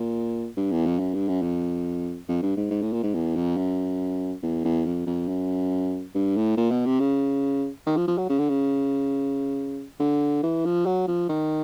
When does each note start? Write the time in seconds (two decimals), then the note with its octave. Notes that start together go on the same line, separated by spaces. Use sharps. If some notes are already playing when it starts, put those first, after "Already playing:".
Already playing: A#2
0.57 G2
0.72 E2
0.86 F2
0.99 F#2
1.14 G2
1.28 F#2
1.42 F2
2.28 F2
2.43 G2
2.57 G#2
2.71 G#2
2.82 A2
2.93 A#2
3.04 G#2
3.14 E2
3.36 F2
3.57 F#2
4.43 E2
4.65 E2
4.86 F2
5.07 F2
5.28 F#2
6.15 G2
6.36 A2
6.57 A#2
6.71 B2
6.86 C3
7.00 C#3
7.86 D#3
7.97 F3
8.07 F3
8.18 F#3
8.30 C#3
8.39 D3
8.49 C#3
10.00 D3
10.43 E3
10.65 F3
10.86 F#3
11.08 F3
11.29 D#3